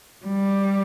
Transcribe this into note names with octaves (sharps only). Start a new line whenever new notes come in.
G3